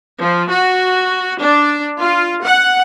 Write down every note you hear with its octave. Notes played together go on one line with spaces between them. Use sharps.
F3
F#4
D4
F4
F#5